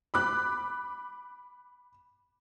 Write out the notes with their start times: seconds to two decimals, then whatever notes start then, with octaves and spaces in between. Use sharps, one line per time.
0.14 B5 D6 F#6